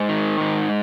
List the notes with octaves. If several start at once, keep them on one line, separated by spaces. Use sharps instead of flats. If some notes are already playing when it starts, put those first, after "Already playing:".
Already playing: G#2
D#3
G#2